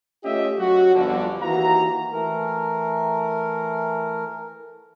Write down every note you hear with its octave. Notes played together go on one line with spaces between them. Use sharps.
A3 C#4 F4 G4 D#5 E5
F#3 F#4
G1 F2 D3
D#2 E3 F#4 F5 A#5
E3 A3 A#4